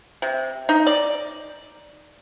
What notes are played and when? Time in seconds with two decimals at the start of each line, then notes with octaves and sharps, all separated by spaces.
0.22 C3
0.69 D#4
0.87 D5